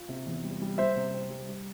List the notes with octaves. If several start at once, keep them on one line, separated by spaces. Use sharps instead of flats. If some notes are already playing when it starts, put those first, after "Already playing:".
Already playing: F4
C3
E2
G3
G3
G3 C5 E5
C3
C4
G3
G3